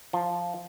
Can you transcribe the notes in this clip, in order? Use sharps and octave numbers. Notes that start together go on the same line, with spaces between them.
F3